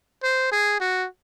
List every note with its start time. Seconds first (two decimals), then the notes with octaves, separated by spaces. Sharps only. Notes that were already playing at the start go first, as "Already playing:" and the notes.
0.23 C5
0.52 G#4
0.81 F#4